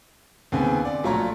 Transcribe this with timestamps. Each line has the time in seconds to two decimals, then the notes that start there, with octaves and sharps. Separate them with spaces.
0.52 D#2 C#3 B3 C4 G#5
0.85 D5
1.04 A#1 F#3 A3 F4 C#5 A#5